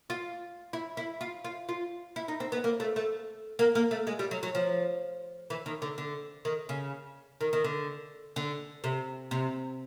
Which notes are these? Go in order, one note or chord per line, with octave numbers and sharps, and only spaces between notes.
F4
E4
E4
F4
F4
F4
E4
D#4
C4
B3
A#3
A3
A3
A#3
A#3
A3
G#3
G3
F#3
F#3
F3
E3
D#3
D3
D3
D#3
C#3
D#3
D#3
D3
D3
C3
C3